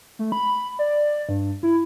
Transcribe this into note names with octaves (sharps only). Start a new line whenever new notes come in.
A3
B5
D5
G2
E4